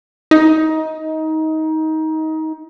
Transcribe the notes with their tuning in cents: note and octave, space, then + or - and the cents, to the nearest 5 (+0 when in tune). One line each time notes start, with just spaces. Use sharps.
D#4 +20